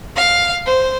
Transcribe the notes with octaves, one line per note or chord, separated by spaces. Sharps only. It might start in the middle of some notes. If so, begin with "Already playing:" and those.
F5
C5